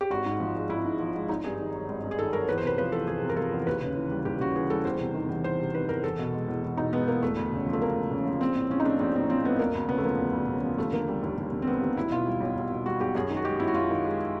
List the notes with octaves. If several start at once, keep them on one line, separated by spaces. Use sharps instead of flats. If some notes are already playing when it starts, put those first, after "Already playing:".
G4
G#1 F#4
G#2
F3
G#3
G#1 E4
G#2
F3
G#3
G#1 D#4
G2 G#4
D#3
F#3
G#1
G2
G#4
D#3 A4
F#3 A#4
E2 B4
C5
C3 B4
F3 B4
E2 A4
E2 G#4
C3
A#4
F3 A4
E2
D#2 B4
C#3
E3
G3
D#2 G4
C#3 F#4
E3 G#4
G3 A4
E2 C5
C3
D#3
E2
E2 C5
C3
D#3 B4
E2 A#4
E2 A4
B2
G#3
E2
E2
B2 D#4
G#3 B3
E2 A#3
E1 A3
D2
C#3
F3
A3
E1 A#3
D2
C#3
F3
A#1 C4
A2
F3 C#4
D#4
A3 D4
A#1 C4
A2 C4
F3 C4
A3 B3
E1 A#3
D2
C#3 B3
A3
F3 A#3
E1
D2
C#3
F3
D#2 A3
D3 A#3
G3
D#2
D#2
D3
C4
G3 B3
D#2
B1 E4
B2 F4
G3
B1
B1
B2
G3 F#4
B1 G4
F#2 G#4
D#3
F#4
G#3 G4
F#2 E4
F#4
F#2 F4
D#3
G#3